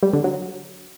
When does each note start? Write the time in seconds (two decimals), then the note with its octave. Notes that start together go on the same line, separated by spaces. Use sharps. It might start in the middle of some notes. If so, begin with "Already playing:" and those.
0.03 G3
0.13 D3
0.24 F#3